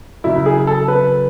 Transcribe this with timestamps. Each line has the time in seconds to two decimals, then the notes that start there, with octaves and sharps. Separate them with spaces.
0.24 F#2 C#3 F#3 E4
0.46 G#4
0.67 A4
0.88 B4